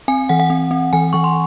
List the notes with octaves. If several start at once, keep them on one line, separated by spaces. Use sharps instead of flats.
C4 G#5
E3 F#5
F#5
C4
C4
E3 G#5
E3 C#6
C6